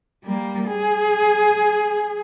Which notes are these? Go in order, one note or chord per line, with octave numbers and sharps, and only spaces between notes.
G3 A#3
G#4